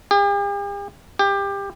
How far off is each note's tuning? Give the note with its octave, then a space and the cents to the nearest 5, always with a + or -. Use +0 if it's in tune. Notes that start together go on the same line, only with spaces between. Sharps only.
G4 +45
G4 +20